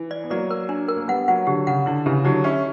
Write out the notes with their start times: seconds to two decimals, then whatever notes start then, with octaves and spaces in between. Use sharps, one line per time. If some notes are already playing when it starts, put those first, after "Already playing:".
Already playing: E3
0.11 D5
0.24 B3
0.30 F#3 A#3 D5
0.51 A#4
0.69 D4
0.89 A#4
0.97 A#3
1.08 G3 B3 F#5
1.28 F#3 A#3 F#5
1.47 D3 F#3 G4
1.67 C#3 F#5
1.86 D3 E4
2.06 C#3 E3 G4
2.25 D3 F#3 G4
2.44 C#4 E4 G4